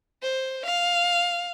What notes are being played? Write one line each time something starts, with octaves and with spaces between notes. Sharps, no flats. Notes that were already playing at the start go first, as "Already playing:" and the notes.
C5
F5